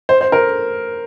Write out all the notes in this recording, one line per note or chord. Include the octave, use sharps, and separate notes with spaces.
C5
C5
A#4